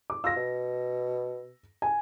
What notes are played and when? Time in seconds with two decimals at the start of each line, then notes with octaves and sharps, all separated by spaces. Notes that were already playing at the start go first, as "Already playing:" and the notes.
0.10 D6
0.24 F4 E6 A#6
0.36 B2
1.82 G#5